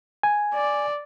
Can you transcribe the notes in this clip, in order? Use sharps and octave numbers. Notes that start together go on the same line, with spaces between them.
G#5
D5